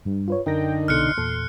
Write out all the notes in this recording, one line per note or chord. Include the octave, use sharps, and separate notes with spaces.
G2
F4 B4 C#5
F#2 D3 D#4 A#4 G5 A#6
C2 B2 A4 C6 F6 F#6 C#7
E2 A#2 A4